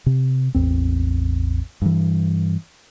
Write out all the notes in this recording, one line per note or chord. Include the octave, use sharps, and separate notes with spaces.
C3
A1 E2 C4
G2 E3